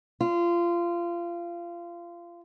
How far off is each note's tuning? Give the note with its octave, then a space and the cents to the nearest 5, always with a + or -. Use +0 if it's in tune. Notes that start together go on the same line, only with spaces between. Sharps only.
F4 -25